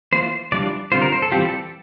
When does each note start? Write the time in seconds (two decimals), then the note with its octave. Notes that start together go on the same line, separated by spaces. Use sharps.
0.13 E3 A#3 F4 C5
0.52 E3 G3 D4 F4 D5
0.92 D3 G3 C4 F4 C5
1.02 A#4
1.12 C5
1.22 A4
1.32 E3 G3 C4 F4 G4
1.45 A4